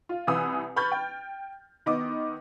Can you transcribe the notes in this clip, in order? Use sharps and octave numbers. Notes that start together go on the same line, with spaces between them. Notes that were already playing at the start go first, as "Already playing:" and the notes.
F4
C2 E3 B4 D#6 E6
B4 B5 C#6 F6 G6 A6
G5
D#3 B3 D#5 D6